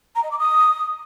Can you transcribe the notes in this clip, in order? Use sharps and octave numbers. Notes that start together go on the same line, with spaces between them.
A#5
D#5
D6
D#6